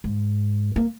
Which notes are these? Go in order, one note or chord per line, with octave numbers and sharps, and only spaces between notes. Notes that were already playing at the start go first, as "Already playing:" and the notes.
G#2
A#3